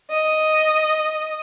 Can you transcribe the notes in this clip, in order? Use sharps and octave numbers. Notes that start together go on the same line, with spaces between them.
D#5